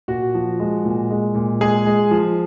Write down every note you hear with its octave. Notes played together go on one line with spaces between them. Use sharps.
A#2 F#4
F3
G#3
A#2
G#3
A#2
G#3 G#4
G#3
F3